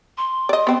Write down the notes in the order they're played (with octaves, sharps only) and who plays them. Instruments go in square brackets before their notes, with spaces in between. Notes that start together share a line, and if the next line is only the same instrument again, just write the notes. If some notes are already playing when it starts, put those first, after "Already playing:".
[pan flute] C6
[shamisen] D5 D#5
B3 C4